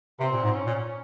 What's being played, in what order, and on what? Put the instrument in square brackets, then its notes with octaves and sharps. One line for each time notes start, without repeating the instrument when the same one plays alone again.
[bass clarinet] C3 [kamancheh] C4
[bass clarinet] A#2
G#2
[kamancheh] C#4
[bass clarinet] A#2